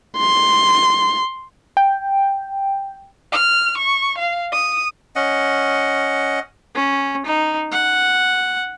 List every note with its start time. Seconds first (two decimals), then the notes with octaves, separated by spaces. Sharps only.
0.18 C6
1.77 G5
3.32 F6
3.78 C#6
4.18 F5
4.52 D#6
5.16 C#4 D#5 F#5
6.75 C#4
7.26 D#4
7.72 F#5